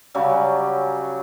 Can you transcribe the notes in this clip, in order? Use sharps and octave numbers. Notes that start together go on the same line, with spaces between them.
C#3 F#3 G3